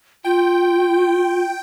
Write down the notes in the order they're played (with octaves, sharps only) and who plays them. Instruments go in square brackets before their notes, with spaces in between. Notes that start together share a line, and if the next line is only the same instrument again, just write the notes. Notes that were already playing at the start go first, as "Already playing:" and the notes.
[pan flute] F4 [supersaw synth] G5